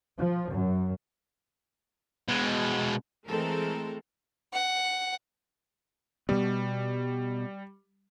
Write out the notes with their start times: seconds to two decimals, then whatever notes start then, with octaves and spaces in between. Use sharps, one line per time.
0.18 F3
0.50 F#2
2.28 B2 G#3
3.27 E3 G#3 A3 C4 A4 A#4
4.53 F#5
6.29 B2 G3 B3